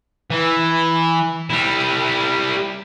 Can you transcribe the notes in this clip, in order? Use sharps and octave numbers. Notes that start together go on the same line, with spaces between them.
E3
G3 E4